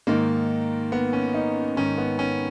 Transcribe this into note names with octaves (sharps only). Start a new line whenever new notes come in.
G#2 D#3 A#3
B3
C#4
D#4
G#2 D#3 C#4
B3
C#4